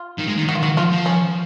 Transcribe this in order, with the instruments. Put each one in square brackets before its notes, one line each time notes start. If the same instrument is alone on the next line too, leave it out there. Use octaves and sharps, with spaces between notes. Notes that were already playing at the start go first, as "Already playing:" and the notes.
Already playing: [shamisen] F4
[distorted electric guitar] D#3
G#3
D#3
[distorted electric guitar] D#3 [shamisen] F#4
[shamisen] F4
[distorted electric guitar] D#3 [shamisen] F#4
[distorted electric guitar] F3 [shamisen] F4
[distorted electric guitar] F3
[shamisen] C#4